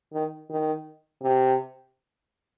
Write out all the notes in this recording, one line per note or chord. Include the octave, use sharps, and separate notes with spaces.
D#3
D#3
C3